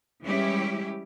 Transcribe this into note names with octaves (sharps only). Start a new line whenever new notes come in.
E3 G3 G#3 C#4 E4 G4